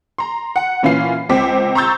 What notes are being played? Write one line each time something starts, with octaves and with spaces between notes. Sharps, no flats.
A#5 C6
F#5
A#2 E3 C#4 F4 F5 C7
C#2 C4 D6 B6
A#5 C6 C#6 E6 G6 A6